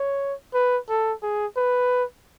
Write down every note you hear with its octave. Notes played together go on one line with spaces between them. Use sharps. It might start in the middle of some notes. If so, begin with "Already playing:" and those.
Already playing: C#5
B4
A4
G#4
B4